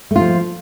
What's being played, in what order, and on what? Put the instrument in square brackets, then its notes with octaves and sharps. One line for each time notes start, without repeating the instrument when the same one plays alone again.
[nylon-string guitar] A3
F4
F3